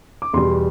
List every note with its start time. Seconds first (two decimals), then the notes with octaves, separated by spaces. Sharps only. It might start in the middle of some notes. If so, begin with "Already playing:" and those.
0.22 D6
0.33 E2 B2 G3 C6